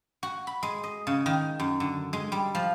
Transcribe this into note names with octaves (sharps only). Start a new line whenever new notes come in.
F#4
B5
G#3
D#5
C#3
D#3
F#2
D3
G#3
G3
F3